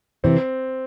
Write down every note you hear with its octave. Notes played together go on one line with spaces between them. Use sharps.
C3 E3 C4